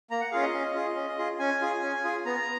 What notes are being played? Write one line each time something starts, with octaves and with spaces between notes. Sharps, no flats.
A#3 A#5
F#5
C#4 F4 G#4 F5
D#5
C#4
F4 G#4
C#4
F4 G#4
C#4 G#5
F4 G#4
C#4
F4 G#4
B3 A#5